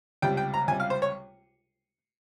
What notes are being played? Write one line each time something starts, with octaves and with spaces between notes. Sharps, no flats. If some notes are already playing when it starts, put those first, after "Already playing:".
C#2 C3 G3 G5
G5
A#5
C#2 C3 G3 G#5
F5
C5
C#5